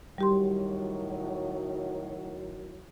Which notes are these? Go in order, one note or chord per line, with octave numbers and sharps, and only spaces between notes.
A2 D#3 F#3 G3 G4 C6